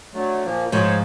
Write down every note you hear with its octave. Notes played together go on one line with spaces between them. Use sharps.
D3 F#3 A3
A#2 F3 A#3
G#2 F3 C5 C#5